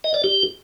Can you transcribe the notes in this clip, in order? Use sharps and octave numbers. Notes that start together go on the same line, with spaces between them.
D#5
D5
G4